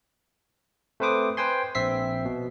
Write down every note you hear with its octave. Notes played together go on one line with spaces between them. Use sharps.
A3 C4 B4 C5 D6 D#6
B4 C5 G5 G#5 C6
A#1 C4 E5 B6 C7
B2